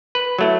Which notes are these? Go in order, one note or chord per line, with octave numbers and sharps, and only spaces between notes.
B4
F#3 A3 E4